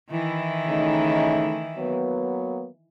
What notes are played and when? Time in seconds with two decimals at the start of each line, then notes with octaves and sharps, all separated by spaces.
0.10 D#3 E3 E4
0.66 C#3 A3 D#4
1.76 F#3 A#3 B3